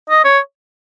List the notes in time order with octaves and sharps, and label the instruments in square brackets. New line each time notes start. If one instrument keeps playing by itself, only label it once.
[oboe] D#5
C#5